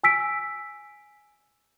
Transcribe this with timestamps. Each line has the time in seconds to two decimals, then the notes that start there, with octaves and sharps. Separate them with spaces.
0.04 G#5 E6 B6 D7